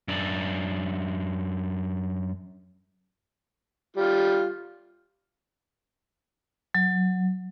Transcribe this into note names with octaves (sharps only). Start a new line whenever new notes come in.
F#2 D4
G3 F4
F#3